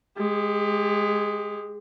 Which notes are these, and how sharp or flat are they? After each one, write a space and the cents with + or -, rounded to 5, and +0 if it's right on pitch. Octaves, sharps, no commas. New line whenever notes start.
G#3 +0 G4 +30